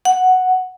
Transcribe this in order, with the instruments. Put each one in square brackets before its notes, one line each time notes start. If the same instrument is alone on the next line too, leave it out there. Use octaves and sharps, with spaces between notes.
[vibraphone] F#5